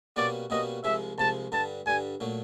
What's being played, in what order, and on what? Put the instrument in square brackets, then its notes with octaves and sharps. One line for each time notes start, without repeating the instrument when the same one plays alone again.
[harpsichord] B2 G3 A#3 C#4 F#4 [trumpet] D5
[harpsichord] B2 G3 A#3 C#4 F#4 [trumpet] D#5
[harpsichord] C2 C3 F3 G#3 [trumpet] E5
[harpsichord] C2 C3 F3 G#3 [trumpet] A5
[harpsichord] G2 D3 G3 [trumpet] A5
[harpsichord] G2 D3 G3 [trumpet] G#5
[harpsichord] A#2 F#3 A3